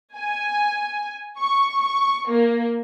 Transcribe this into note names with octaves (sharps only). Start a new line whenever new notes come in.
G#5
C#6
C#6
A#3